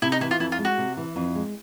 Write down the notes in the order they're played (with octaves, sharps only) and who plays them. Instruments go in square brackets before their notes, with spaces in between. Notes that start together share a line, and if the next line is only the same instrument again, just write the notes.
[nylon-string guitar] C3 [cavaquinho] E4
[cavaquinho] D#4
[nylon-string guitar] E3 [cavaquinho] E4
[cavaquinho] F4
[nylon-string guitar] F2 [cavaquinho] E4
[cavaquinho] F4
[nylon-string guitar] G#3
[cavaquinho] F#4
[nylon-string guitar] C3
E3
F2
G#3